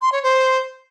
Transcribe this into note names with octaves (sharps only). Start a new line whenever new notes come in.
C6
C#5
C5